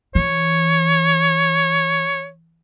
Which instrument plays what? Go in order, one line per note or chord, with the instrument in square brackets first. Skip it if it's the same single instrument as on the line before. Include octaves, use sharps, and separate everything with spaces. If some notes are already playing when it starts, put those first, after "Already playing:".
[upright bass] E3 [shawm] C#5